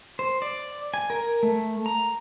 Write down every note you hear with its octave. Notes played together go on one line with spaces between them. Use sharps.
C5
D5
G#5
A#4
A3
A#5